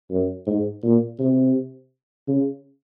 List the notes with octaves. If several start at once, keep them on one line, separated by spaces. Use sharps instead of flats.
F#2
G#2
A#2
C3
C#3